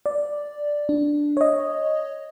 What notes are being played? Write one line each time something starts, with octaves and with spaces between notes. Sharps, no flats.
D5
D4
C#5 D#5